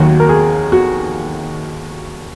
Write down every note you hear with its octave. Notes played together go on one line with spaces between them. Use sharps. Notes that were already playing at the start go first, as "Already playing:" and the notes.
Already playing: D#2 D#3 F#3 A#3 F#4
A#4
G#4
F#4